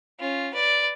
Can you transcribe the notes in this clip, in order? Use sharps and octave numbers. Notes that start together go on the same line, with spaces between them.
C#4 F4
B4 D5